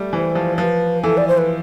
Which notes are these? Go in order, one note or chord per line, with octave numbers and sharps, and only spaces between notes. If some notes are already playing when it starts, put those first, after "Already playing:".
Already playing: G3 A3
E3 C5
F3
F3 B4
E3 A4
D5
C5
B4